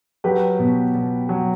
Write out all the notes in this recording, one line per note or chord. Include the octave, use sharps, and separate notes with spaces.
F#3 G4 B4
B2
B2
F#3